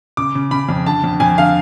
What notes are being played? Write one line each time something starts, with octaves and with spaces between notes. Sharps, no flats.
C#3 D6
C#3
C#3 B5
F2
D3 A5
F2
F2 G#5
D3 F5